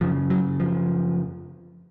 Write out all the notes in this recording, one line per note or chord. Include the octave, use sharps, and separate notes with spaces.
F#2 C#3 F3
F#3
F3